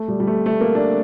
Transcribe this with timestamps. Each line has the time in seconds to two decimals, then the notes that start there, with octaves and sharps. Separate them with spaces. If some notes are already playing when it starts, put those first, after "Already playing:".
Already playing: A3
0.08 G3
0.20 G3
0.27 A3
0.46 A3
0.60 A#3
0.75 D4